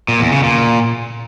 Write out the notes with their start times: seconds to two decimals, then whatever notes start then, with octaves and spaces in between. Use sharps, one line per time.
0.08 A#2
0.20 E2
0.32 C#3
0.43 A#2